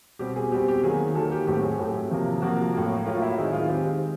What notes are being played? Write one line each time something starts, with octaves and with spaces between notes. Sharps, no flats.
B2 G3 C4 G4
G#4
B2 G3 C4 G4
G4
D#3 F#3 A#3 G#4
D#3 F#3 A#3 A4
G4
A2 F#3 A3 C4 G4
G#4
A2 F#3 A3 C4 G4
C3 F3 A#3
C3 F3 A#3 F#4
A2 F#3 A#3
A2 F#3 A#3 F4
F4
E4
D#3 G#3 C4 D#4
F4
D#3 G#3 C4 G4